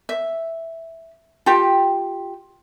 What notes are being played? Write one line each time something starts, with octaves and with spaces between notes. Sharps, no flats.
E5
F4 G4 G5